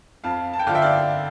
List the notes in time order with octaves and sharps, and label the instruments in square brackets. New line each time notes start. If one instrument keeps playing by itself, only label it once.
[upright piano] F2 F5 A5
A5
G5
D3 F3 F5
E5 G5
D5 F5